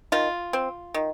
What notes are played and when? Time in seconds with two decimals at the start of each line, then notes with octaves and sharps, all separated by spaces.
0.12 D#3 F4
0.53 C4
0.94 D#3